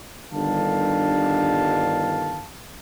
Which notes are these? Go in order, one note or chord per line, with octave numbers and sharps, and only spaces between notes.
G1 G2 D3 D#3 F5 A5